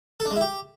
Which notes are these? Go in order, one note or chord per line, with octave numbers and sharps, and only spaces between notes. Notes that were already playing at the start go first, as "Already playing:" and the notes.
A4
D4
G#3
E4
G4